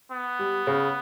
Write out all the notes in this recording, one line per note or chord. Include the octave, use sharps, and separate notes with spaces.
B3
G3
C#3